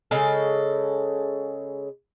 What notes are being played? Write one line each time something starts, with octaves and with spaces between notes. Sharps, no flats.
C#3 G#3 A4